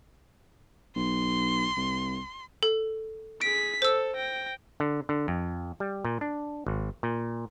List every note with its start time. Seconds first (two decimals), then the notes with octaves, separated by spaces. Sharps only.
0.96 B1 C6
1.77 C2
2.63 A4
3.41 G#4 B6 D7
3.82 A4 C5 E6
4.16 G5 A#6
4.80 D3
5.09 D3
5.28 F2
5.80 G3
6.05 A#2
6.21 D4
6.67 G#1
7.03 A#2